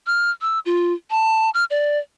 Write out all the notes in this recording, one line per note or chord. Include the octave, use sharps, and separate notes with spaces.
F6
E6
F4
A5
F6
D5